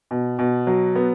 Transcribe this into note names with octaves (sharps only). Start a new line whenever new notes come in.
B2
B2
F#3
B3